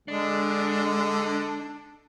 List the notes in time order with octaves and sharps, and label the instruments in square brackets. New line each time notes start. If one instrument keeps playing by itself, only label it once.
[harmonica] D3 [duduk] G#3 [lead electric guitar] D4